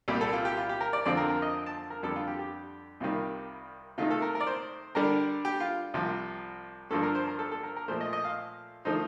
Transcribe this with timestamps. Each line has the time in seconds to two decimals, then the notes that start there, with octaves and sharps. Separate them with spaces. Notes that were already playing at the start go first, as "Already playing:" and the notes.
0.08 C2 A#2 G3 G4
0.21 A4
0.33 F4
0.45 G4
0.57 F4
0.69 G4
0.81 A#4
0.93 D5
1.05 F2 D3 F3 C4 F4 D5
1.17 A#4
1.30 A#4
1.42 D#5
1.66 A5
1.90 A#4
2.03 F2 D3 G3 A4
2.16 F4
2.28 G4
2.39 G4
3.00 C2 C3 D#3 G3 F4
3.98 C3 D#3 A3 D#4 F4
4.11 A4
4.22 A#4
4.35 A#4
4.40 D5
4.47 C5
4.95 D3 G3 D4 A#4
5.45 G4
5.60 F4
5.94 C2 C3 F3
6.91 G2 D3 F3 A#3 D4 A4
7.03 A#4
7.15 C5
7.27 A#4
7.39 A4
7.52 A4
7.63 A#4
7.76 A#4
7.88 A#2 F3 A3 C5
8.01 D#5
8.13 D#5
8.24 F5
8.85 D3 F3 A3 D#4 C5